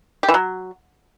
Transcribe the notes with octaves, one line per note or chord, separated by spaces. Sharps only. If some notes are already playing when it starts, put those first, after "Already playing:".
G4
E3
F#3